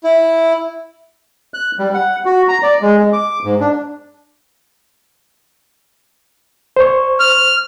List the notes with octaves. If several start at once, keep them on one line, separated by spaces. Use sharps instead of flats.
E4
F#6
G3
F#5
F#4
A#5
D5
G#3
G#3
D6
G#2
D4
C5 C#6
F6